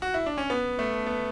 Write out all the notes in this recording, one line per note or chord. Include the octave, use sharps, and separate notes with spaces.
F#4
E4
D4
C#4
B3
A3
B3